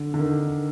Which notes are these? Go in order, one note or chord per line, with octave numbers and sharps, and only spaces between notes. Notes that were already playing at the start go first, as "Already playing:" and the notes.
Already playing: D3
D3
D#3